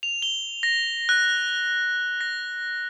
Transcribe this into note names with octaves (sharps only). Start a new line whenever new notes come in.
F7
G7
A#6
F#6
A#6